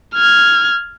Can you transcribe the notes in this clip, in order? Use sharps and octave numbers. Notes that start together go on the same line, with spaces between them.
F6 G#6